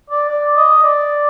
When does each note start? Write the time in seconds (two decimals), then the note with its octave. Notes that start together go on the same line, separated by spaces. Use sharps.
0.10 D5
0.29 D5
0.56 D#5
0.83 D5